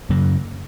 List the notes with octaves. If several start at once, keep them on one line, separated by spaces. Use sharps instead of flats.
F#2 C#3 F#3 A#3